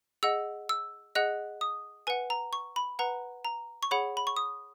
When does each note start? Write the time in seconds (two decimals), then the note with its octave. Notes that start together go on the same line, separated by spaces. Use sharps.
0.23 G#4 D#5 F#5 E6
0.69 E6
1.15 G#4 D#5 F#5 F#6
1.61 D#6
2.07 B4 F#5 G#5
2.30 A#5
2.53 C#6
2.76 B5
2.99 B4 F#5 A#5
3.45 A#5
3.83 C#6
3.91 G#4 C#5 F#5 B5
4.17 B5
4.27 C#6
4.36 D#6